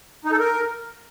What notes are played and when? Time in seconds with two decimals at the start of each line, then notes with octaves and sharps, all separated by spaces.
0.25 D#4
0.32 A4
0.39 A#4